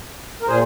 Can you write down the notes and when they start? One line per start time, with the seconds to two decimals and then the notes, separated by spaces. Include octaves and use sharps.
0.42 A#4
0.47 A#2 G#4 C5